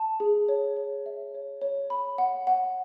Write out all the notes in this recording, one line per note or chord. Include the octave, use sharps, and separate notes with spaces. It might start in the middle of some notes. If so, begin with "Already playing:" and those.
Already playing: A5
G#4
C#5
C#5
E5
C#5
C#5
B5
F#5
F#5